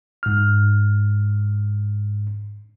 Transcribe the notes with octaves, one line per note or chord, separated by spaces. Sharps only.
G#2 F6